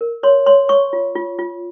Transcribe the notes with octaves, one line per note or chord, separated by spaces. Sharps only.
A#4
C#5 C6
C#5 C6
C#5 C#6
F4
F4
F4